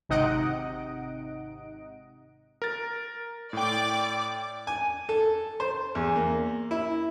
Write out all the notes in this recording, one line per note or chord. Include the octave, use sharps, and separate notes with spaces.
G#1 C3 D#4 D#5 F#5 D7
A#4 A6
A2 D5 G5 D6
G#5
A4
C5
E2
A#3
E4